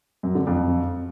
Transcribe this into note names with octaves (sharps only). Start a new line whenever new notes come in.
F#2
D3
F2